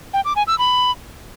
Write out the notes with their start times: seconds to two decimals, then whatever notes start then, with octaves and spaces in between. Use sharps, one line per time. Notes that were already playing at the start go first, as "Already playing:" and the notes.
0.14 G5
0.25 D6
0.36 G#5
0.47 E6
0.59 B5